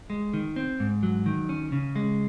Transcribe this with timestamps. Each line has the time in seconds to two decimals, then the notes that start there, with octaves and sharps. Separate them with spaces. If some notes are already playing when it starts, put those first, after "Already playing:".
0.10 G#3
0.34 D#3
0.56 C4
0.80 G#2
1.03 F#3
1.26 D#3
1.49 C#4
1.72 C#3
1.96 G#3